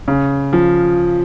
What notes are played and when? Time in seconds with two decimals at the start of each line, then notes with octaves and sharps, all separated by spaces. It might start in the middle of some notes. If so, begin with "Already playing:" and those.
0.08 C#3
0.53 F3